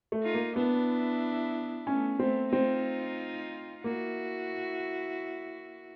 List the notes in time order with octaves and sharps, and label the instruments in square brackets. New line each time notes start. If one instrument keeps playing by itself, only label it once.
[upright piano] A3
[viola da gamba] D#4 F4
[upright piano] A#3
[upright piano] B3 [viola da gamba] D4 E4
[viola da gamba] A3 B3 [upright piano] C#4
[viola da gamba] A3 B3 [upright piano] C4
[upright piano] C4 [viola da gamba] D#4 F4
[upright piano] A#3 [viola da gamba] E4 F#4